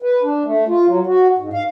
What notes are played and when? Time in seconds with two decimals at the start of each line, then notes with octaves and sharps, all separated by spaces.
0.02 B4
0.23 D4
0.45 A3
0.68 F4
0.86 F#3
1.07 F#4
1.38 G#2
1.53 F5